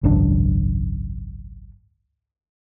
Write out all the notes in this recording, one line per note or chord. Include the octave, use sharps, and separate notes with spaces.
G#1 C#2 F#2 D4